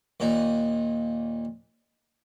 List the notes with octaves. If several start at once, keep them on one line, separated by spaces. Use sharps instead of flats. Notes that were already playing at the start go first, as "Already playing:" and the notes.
D#2 A#2 D#4